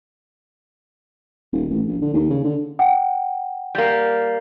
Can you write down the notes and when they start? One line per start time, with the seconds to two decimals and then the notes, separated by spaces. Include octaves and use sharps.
1.52 D#1
1.70 A1
1.88 A#1
2.02 D3
2.14 D#2
2.30 C#3
2.44 D3
2.79 F#5 G5
3.75 G3 A#3